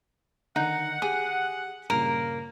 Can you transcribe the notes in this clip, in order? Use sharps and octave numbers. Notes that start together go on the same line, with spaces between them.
D3 D#3 D#4 F#5
G4 G#4
G2 A#2 C#3 A#3 A#4